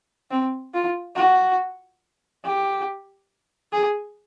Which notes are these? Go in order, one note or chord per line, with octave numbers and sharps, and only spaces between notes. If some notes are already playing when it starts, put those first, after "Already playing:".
C4
F4
F#4
G4
G#4